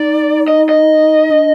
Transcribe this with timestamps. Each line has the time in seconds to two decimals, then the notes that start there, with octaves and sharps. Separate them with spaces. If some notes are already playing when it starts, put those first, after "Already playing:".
Already playing: D#4 D5
0.48 D#5
0.69 D#5
1.31 D4